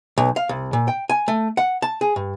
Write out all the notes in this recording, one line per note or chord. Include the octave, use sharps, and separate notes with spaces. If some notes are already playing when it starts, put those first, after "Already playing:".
B1
F5
C2
A#2
G5
G#5
A3
F#5
A5
G#4
G2